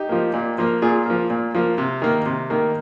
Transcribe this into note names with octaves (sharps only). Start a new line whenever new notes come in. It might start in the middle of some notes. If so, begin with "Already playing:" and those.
Already playing: D#4 G4
F3 A#3
A#2
F3 A#3
A#2 F4 G#4
F3 A#3
A#2
F3 A#3
C3
D#3 A#3
C3
D#3 A#3